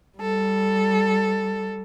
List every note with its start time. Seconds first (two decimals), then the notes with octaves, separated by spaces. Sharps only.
0.18 G3 A4